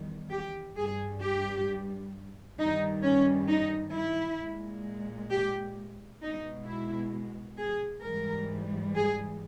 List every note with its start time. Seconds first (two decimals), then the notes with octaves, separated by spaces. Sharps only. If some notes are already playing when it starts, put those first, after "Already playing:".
Already playing: E2 D#3 G3
0.30 G4
0.76 G2 G3 G#4
1.22 G4
2.58 G2 D#3 G3 D#4
3.03 C#4
3.49 D#4
3.95 E4
4.40 A#2 G#3
5.30 G4
6.21 B2 G#3 D#4
6.67 E4
7.59 G#4
8.04 G#2 E3 G3 A#4
8.95 G#4